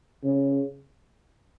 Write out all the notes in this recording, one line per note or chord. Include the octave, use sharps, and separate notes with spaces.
C#3